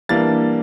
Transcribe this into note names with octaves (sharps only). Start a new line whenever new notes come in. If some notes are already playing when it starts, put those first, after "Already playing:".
E3 G3 A#3 D4 A6